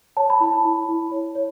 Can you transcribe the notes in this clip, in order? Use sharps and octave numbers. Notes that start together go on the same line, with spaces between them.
C#5 A5
B5
E4 A5
E4
E4
C#5
C#5